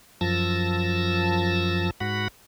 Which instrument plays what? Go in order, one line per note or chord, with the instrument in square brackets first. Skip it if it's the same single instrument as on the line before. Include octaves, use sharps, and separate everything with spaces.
[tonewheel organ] F#2 F3 A5 E6 A#6
G#2 F#4 F#5 B5